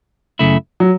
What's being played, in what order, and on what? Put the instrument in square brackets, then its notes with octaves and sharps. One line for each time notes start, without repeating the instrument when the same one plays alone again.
[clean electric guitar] F#2 C#3 A3 E4
[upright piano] F#3